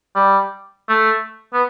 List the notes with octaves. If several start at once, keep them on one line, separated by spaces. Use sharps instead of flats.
G3
A3
B3